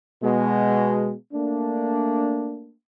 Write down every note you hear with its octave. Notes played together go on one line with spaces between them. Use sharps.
B2 G#3
A3 A#3 D4